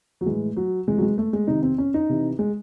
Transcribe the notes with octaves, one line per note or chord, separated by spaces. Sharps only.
F#3
A2 E3 G#3
F#3
C3 E3 G#3
F#3
G#3
A3
G#3
C3 D#3 D#4
C4
C#4
D#4
C3 E3
G#3